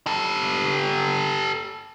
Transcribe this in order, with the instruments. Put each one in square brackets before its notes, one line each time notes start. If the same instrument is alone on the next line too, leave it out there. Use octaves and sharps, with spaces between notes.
[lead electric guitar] G4 A4